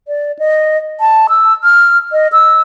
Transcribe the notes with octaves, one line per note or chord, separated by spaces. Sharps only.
D5
D#5
A5
E6
F6
D#5
E6